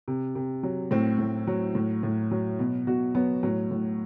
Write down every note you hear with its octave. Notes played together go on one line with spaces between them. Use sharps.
C3
C3
F#3
A2 C4
A2
F#3
A2
A2
F#3
B2
B2 F#4
F#3 B3
A2 F#3
A2